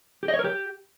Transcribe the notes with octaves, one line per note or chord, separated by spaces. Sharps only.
G4
D#5
C#5
A#4
G4